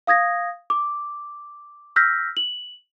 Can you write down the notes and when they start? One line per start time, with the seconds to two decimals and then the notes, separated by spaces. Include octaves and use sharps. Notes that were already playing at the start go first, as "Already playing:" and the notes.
0.07 F5 D#6 G#6 A#6
0.70 D6
1.96 E6 F6 G6 A#6 B6
2.37 F#7